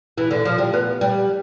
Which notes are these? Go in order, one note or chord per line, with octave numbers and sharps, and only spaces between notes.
E3
D3
F3
G3
B3
G3